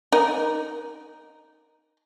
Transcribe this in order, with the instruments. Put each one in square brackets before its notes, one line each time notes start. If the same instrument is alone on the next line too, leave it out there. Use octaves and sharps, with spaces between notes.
[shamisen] D#4 A#4